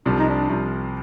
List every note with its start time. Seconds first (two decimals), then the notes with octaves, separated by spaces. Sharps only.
0.05 C2 C3 F3 D4
0.17 D#4
0.28 D4
0.49 C2 C3 F3